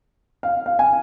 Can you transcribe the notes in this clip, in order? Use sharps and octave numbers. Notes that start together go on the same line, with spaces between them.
F5
F5
G#5